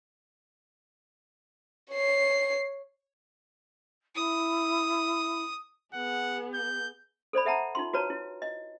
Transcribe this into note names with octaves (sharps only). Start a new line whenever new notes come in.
C#5 C7
E4 D#6
B3 G#4 F#5
G6
A4 C5 D5 B5
A4 E5 F#5 A5 A#5
D#4 F4 C6
F#4 B4 C#5 A5 A#5
E4
D#5